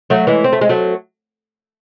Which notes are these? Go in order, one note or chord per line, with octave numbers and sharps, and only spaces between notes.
F#3 A3
E3 G#3
C4
A3
G#3
F#3 A3